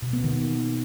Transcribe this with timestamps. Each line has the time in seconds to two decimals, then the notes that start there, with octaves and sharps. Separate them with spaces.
0.02 B2
0.13 B3
0.24 D#3